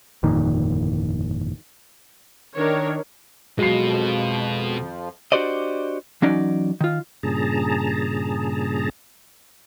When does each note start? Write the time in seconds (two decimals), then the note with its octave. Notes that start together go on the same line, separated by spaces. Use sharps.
0.23 G1 F2 A#2 D#3
2.56 D#3 D4 A#4 C#5
3.59 F2 B2 F3 F#3 G#3 C7
5.32 D4 F#4 G4 C5 D5 D#5
6.22 E3 F#3 C#4 D#4 D5
6.81 D#3 F4
7.23 G2 A#2 C#3 G#4 A5 A#5